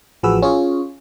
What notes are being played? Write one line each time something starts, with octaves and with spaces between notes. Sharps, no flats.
A1 F3 F#4 G#4 B4 E6
C#4 F4 G#4 C#5